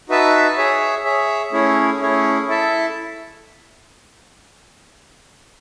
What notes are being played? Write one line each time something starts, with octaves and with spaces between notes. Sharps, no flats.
D#4 F#4 B4 E5 A5
G#4 C#5 E5
G#4 C#5 E5
A3 C#4 E4 G#4 C#5
A3 C#4 E4 G#4 C#5
E4 A4 E5 A5